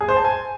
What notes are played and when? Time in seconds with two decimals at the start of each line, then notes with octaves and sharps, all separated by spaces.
0.01 G#4
0.09 C5
0.16 A5
0.24 G#5